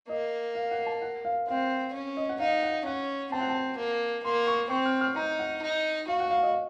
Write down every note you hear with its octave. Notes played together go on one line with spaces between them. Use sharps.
A#3 D#5
F5
F#5
A5
F#5
F5
C4 F5
C#4
D#5
F#5
D#4 F5
F#5
C#4 F#5
C4 A5
F#5
A5
A#3
A#3 C6
C#6
C4 C#6
F6
F6
D#4 A#5
F#5
D#4
F#4 F5
F#5
F5
D#5